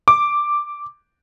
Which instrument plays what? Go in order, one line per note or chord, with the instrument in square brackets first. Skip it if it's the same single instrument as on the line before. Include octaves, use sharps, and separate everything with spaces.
[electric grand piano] D6